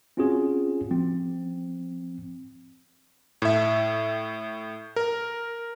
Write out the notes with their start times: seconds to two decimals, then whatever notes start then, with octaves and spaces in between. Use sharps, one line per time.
0.17 C4 C#4 F4 F#4 G#4
0.91 F3 C4
3.42 A2 E5
4.96 A#4